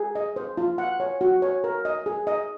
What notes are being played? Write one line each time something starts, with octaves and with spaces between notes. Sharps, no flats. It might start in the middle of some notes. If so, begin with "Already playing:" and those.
Already playing: G#4
D#5
C5
F4
F#5
C#5
F#4
C#5
A#4
D#5
G#4
D#5